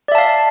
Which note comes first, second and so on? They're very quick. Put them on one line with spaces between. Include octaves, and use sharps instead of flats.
D5 E5 A5 F5